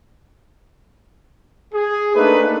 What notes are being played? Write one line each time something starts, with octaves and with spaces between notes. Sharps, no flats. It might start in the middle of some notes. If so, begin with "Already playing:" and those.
G#4
A3 A#3 D4 D#4 A4 B4